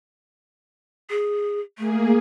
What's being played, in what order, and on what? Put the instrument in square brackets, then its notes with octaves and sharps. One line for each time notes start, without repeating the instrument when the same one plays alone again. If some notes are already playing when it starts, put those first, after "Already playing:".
[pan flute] G#4
[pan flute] A3 [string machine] A#3 G#4